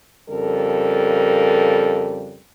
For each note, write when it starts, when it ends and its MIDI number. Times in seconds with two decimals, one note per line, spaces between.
0.29 2.39 41
0.29 2.39 49
0.29 2.39 55
0.29 2.39 69
0.29 2.39 70